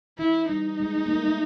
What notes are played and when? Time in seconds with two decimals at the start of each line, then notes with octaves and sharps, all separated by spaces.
0.19 E3 E4
0.49 G3 D#4
0.80 G#3
0.95 A3
1.06 A#3
1.11 A3
1.25 G#3